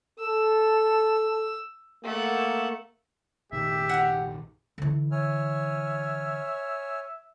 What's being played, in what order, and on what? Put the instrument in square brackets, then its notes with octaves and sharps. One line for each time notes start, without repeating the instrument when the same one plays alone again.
[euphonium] A4 [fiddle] E6
[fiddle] A3 F#5 [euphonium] A#3
[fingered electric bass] F1 A#1 D#3 [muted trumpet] G4 [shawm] E5
[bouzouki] F#5 G5 A#5
[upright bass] D3 E3
[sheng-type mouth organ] C#5 G#5 F6 [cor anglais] E5